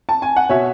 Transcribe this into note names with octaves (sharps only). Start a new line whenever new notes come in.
A5
G#5
F#5
B2 C#5 E5